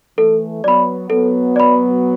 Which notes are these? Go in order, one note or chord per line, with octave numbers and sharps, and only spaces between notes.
E3 A3 A4
F#3 B3 D5 B5
F#3 B3 A4
D5 B5